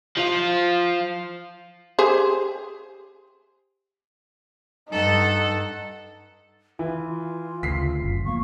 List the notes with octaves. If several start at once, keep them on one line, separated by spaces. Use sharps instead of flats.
F3 F4
G4 G#4 C5
G2 D#4 A4 F#5
E3 F4
D2 C#3 B6 C7
F#1
F1 F3 A#3 C#6